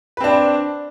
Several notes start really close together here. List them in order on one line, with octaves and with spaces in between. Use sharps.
B4 C4 D4